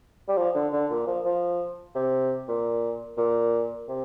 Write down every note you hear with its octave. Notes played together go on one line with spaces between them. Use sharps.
G3
F3
D3
D3
A#2
F3
F3
C3
A#2
A#2
C3